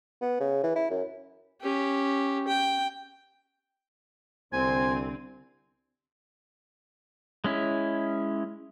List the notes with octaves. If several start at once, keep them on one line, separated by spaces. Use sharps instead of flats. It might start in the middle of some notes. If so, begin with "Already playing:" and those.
B3
C#3
E3
E4
F#2
C#4 G4
G5
C2 D3 C4 C5 G#5
G#3 C#4 E4